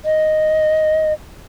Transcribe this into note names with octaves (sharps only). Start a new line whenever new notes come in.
D#5